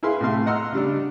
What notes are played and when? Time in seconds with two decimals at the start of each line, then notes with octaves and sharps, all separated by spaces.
0.03 E4 G#4 B4 F5 C6
0.21 A2 C3 A3 F5 C6
0.46 D#5 F#5 A#5 C6 E6 F6
0.72 C#3 G3 D4